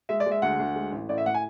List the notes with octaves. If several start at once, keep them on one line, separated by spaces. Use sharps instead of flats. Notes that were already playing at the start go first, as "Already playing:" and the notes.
G#3 E5
D5
G#3
E5
D2 F#5
D2
G#3
A1
A1 D5
E5
A2 F#5
G#5